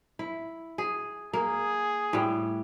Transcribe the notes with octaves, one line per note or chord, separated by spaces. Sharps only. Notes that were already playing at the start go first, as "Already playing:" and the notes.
E4
G#4
A#3 G#4
A2 G3